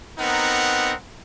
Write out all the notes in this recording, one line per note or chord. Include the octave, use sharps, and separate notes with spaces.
B3 C4 D#4 A#4 F#5